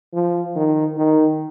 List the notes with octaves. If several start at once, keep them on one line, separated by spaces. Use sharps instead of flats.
F3
D#3
D#3